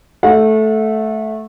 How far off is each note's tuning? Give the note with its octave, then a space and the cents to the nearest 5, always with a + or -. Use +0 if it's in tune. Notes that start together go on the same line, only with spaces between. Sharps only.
A3 -10 F#5 -35